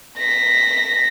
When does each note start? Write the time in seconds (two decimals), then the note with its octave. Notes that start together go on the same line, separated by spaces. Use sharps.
0.18 A#6 B6